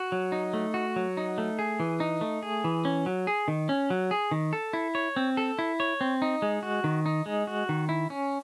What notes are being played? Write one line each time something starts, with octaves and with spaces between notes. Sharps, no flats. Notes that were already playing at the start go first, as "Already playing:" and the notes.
Already playing: F#4
F#3
D#4
A3
F#4
F#3
D#4
A3
G#4
E3
D#4
A3
G#4
E3
C#4
F#3
G#4
D#3
C#4
F#3
G#4
D#3
A4
E4
C#5
C4
A4
E4
C#5
C4
D#4
G#3
F#4
D#3
D#4
G#3
F#4
D#3
E4
C#4